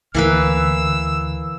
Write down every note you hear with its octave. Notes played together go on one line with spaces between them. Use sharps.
D2 E3 A#3 B4 E6